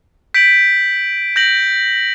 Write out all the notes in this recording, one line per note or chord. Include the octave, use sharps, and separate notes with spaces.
G6 B6 D7 F#7
G6 A#6 D7 F#7